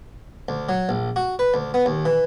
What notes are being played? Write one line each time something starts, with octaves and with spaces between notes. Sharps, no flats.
D2
F#3
A#1
F#4
B4
D2
B3
D#2
E3